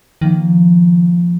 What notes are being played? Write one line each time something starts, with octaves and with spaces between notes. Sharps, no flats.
D#3 F3 A#3